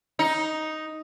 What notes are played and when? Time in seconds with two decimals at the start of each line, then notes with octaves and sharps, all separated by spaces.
0.19 D#4